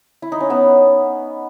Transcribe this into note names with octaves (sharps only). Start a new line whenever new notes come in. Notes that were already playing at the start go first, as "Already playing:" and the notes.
E4
D#4
C#4
B3